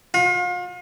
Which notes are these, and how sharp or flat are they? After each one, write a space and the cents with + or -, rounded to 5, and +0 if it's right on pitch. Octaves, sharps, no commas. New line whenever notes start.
F4 +40